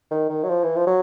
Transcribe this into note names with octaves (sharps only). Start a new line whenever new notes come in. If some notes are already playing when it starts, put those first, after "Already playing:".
D#3
D#3
F#3
F3
E3
F3
F#3